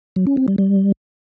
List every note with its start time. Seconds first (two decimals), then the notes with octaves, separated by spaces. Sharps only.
0.16 F#3
0.27 C#4
0.37 C4
0.48 G3
0.58 G3